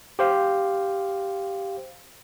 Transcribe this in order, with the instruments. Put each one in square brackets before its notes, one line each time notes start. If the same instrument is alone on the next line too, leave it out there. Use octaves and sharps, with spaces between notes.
[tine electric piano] G4 C5 F5